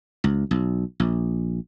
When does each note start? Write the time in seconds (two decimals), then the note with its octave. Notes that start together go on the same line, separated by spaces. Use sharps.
0.24 C#2
0.51 B1
1.00 A#1